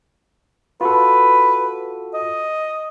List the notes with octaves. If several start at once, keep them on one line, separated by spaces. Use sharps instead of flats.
F4 F#4 A4 B4
D#5